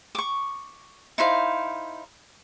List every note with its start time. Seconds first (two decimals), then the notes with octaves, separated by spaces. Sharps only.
0.15 C#6 D6
1.18 D#4 E4 C5 F5